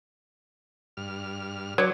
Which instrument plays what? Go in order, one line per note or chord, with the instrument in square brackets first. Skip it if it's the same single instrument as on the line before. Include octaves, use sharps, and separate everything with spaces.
[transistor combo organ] G2 F6
[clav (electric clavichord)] F#3 [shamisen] C#5 D5